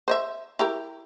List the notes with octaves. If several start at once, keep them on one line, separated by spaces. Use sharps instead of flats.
C5 D#5 E5
E4 G4 A#4